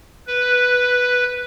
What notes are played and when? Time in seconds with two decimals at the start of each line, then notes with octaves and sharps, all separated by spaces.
0.27 B4